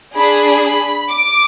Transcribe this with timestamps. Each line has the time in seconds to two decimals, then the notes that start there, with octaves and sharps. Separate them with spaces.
0.16 D4 G#4 B5
0.63 B5
1.10 D6